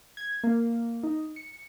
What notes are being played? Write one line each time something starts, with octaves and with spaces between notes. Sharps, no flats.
G#6
A#3
D#4
C#7